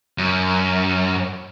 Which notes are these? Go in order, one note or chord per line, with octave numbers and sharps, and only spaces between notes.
F#2